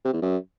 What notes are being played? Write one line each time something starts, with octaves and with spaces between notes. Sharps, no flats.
C3
E2
F#2